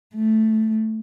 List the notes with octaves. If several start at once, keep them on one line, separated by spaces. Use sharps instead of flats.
A3